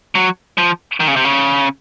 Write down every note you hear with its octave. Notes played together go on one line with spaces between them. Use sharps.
F#3
F3
D#3
C#3
C3
C#3